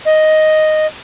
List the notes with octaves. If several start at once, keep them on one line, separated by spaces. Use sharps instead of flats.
D#5